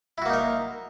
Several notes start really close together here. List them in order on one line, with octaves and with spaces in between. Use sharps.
E4 F#4 A#3 D#4 A#4